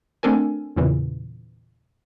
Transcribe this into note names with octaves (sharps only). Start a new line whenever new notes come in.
A3 C4 D4 A4 A#4 G#5
E2 A#2 C#3 E3